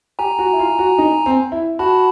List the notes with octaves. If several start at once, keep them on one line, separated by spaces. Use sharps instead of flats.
G4 G#5 A#5
F#4
E4
F4
F#4
D#4
C4
E4
F#4 A5 B5